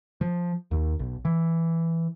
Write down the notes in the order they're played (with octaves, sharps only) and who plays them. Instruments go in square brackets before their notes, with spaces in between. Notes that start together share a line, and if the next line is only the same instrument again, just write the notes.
[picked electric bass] F3
D#2
B1
E3